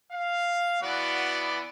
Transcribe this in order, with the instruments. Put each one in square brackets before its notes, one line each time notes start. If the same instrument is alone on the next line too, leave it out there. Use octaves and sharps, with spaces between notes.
[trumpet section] F5
[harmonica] E3 B3 D5 [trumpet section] F#4 F#5